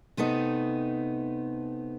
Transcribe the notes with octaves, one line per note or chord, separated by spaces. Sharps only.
C3 A3 B3 D#4